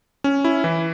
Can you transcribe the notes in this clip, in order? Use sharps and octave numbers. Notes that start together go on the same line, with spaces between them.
C#4
E4
E3